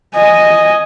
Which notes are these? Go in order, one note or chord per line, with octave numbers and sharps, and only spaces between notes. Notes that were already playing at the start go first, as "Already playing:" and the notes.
D#5 G#5